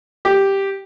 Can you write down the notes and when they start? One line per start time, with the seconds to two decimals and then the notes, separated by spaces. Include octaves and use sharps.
0.25 G4